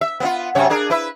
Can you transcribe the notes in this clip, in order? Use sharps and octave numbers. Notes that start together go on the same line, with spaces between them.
E5
B3 C4 F4
F#2 C3 C#5
D4 G#4 A#4
E4 B4 E5